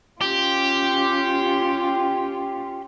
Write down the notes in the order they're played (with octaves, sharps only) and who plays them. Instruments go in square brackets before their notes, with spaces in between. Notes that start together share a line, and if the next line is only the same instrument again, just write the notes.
[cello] C#4 F4 [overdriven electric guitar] G4